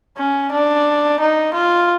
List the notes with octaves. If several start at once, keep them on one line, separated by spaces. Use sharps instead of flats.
C#4
D4
D#4
F4